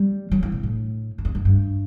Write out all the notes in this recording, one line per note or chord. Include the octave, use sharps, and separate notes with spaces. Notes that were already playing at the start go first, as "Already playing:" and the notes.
Already playing: G3
F#3
E3
B2
A2
F#2
E2
F#2
G2